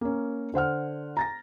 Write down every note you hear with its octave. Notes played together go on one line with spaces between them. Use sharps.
A#3 C#4
D3 C5 F#5 F6
A#5 A6 A#6